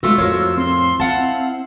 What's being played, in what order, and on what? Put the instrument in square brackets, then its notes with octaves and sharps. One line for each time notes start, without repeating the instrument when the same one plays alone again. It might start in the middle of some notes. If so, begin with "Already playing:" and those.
[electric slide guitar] G#3 A3 F#4 [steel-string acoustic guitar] B3 F4 [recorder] E6
[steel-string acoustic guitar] F2 A2 F4 [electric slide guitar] F#4 A#4 C#5
[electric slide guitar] C4 [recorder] C6
[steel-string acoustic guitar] E4 F#5 A5 [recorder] F5